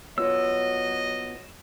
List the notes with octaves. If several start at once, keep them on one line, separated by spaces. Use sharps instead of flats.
F#3 B3 F4 C#5 D#5 E6